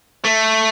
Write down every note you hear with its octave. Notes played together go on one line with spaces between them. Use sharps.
A3